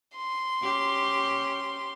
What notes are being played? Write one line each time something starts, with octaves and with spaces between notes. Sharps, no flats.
C6
C#4 G4